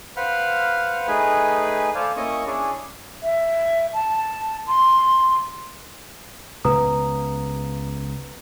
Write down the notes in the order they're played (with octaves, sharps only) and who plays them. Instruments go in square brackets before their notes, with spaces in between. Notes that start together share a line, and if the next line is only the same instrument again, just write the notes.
[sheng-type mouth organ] B4 C5 F5 F#5 B5 F6
A3 D#4 G#4 B4 G#5 B5
A4 C5 D5 F5 G#5
A#3 C#4 E4 D#5 C#6 D#6
C#4 D4 E4 G#4 C#5 D5
[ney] E5
A5
C6
[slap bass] C#2 C#3 B3 [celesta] B4 A#5 D#6